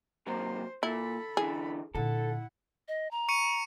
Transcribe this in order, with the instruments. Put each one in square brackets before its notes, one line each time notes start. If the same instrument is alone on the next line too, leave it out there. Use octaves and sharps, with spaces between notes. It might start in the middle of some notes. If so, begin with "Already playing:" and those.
[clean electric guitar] C3 F#3 A#3 [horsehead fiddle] C5
[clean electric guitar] A#2 [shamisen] E4 [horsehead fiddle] A4 B5
[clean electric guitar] D3 E3 [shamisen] G#4
[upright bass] A#2 D3 [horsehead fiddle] E4 F#5 [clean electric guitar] A4
[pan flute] D#5
A#5
[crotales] C#6 C#7 D#7